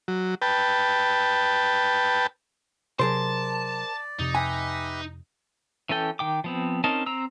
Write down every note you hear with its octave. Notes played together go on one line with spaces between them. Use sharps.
F#3
B4 G5 A5
C3 F#3 G#4 A#4 C5 D5 A5
F2 C3 D#4
G4 B4 E5 G#5
E3 C#4 A4 G5
D#3 G5 D6
F3 B3 C4
C4 C#4 D#4 A#4 A5
C4 A#5 E6